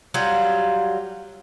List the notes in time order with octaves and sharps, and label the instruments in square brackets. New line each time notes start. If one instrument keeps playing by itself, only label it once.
[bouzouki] F#3 G3 F4